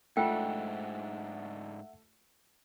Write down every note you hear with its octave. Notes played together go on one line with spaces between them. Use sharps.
G#2 A3 D4 F4 E5 F#5 G5